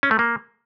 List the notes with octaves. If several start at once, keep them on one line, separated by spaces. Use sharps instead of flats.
C#4
A3
A#3